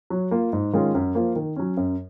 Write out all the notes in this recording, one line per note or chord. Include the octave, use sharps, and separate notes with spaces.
F#3
A#3 F4
G#2
D#3 G#3 C#4 F4
F#2
F3 A#3 F4
D#3
F#3 C#4
F#2